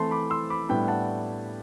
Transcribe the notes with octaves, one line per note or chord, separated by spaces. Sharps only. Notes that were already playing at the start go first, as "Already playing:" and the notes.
Already playing: E3 A3 C4 E4 A5 C6
B5 D6
C6 E6
B5 D6
A2 G3 B3 D4 G5 B5
F#5 A5